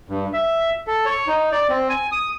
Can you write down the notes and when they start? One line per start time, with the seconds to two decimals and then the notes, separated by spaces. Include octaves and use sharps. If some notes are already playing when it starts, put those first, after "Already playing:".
0.09 G2
0.33 E5
0.87 A4
1.06 C#5
1.27 D#4
1.52 D5
1.69 C4
1.89 G#5
2.12 D#6